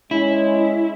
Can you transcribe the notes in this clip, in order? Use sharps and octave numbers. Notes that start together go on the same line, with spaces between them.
G#3 C#4 E4